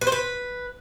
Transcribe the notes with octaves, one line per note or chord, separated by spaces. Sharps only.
B4
C5
B4